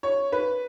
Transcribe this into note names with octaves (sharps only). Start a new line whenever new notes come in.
C#5
B4